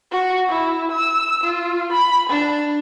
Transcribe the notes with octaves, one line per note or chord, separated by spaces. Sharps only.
F#4
E4
E6
F4
B5
D4